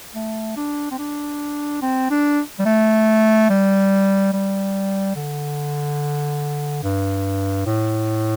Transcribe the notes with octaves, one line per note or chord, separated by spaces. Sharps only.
A3
D4
C4
D4
C4
D4
G3
A3
G3
G3
D3
G2
A2